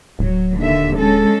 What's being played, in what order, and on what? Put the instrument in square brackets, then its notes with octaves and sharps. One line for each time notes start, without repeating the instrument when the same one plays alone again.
[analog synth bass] D1 [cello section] F#3
[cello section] D#2 D3 E5
G#3 C#4 A4